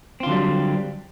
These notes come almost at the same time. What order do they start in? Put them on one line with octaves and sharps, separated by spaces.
C4 F4 D3 F#3 G3